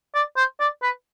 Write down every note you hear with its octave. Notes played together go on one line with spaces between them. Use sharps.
D5
C5
D5
B4